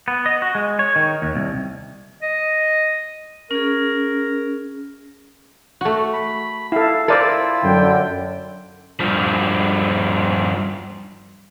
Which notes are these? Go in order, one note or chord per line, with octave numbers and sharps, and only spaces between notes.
B3
D#5
F#4
G#3
C#5
D#3
D#2
C2
D#5
C#4 G#4 A#4
A3 F#4
B5
E4 A4 F5
E4 F4 A4 A#4 C5 D5
F#2 D3 G5
G2 F3